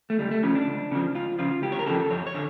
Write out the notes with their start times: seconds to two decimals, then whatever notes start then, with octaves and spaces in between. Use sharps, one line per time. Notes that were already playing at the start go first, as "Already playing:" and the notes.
0.10 A3
0.19 C#2 G3
0.31 A3
0.43 C#3 F3 C#4
0.55 D4
0.67 C#2
0.92 C#3 F3
1.15 C#2 F4
1.39 C#3 F3 F4
1.62 C#2 G4
1.72 C#5
1.79 A#4
1.86 C#3 F3 A4
2.10 F2 C#5
2.27 C#5
2.34 D3